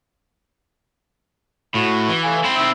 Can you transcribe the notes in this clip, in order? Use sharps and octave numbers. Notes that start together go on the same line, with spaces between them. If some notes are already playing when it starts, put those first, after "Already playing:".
A2 F#4
E3
A3 F5 G#5
C4 E4
D#3 E5 E6